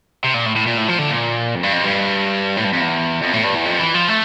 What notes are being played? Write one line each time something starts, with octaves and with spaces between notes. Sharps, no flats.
C3
A#2
A2
A2
A#2
A2
F3
D3
A#2
F2
G2
F2
G2
A2
G2
F2
E2
F2
A2
G2
E2
F2
E3
F3
A3